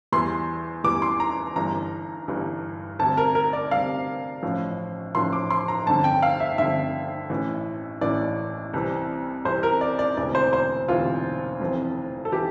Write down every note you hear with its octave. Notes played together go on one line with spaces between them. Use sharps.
E2 E3 G3 C6
E2 E3 G3 D6
C6
A#5
G1 G2 E3 A#5
G1 G2 E3
D2 C3 G3 A5
A#4
A#4
D5
D2 C3 G3 F5
A1 A2 F3
A1 A2 F3 C6
D6
C6
A#5
G1 F2 D3 A5
G5
F5
E5
G1 F2 D3 E5
A1 A2 E3
A1 A2 E3 D5
C2 C3 E3
C2 C3 E3 C5
A#4
D5
D5
E1 D2 C3 E3 D5
C5
C5
E1 D2 C3 E3 F4
F1 F2 E3
A4
E3 G4